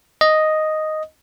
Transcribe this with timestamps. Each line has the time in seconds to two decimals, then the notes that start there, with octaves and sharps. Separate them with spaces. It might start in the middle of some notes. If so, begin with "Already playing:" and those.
0.21 D#5